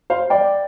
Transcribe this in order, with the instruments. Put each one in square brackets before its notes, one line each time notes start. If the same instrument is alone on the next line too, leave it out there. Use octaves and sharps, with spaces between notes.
[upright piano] C5 F5
D5 G5